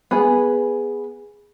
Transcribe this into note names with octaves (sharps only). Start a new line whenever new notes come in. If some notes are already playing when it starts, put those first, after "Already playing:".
B3 G#4 B4